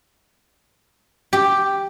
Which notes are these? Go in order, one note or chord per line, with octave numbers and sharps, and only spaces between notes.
G4